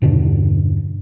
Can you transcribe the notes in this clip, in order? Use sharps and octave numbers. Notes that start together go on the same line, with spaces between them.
E2 G2 B2 D3